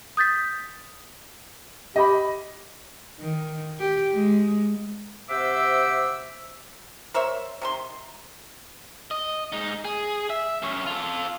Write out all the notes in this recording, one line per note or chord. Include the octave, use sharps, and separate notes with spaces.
D#6 G6 A6 B6
G4 D#5 B5
D#3
G4
G#3
C3 C5 E5 F#5 D6 E6
A#4 C5 C#5 E5
C3 D#3 C6
D#5
G#2 D#4
G#4
E5
F#2 C#5
F4 A4